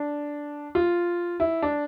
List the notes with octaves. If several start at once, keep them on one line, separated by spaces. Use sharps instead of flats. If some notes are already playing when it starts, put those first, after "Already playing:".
Already playing: D4
F4
E4
D4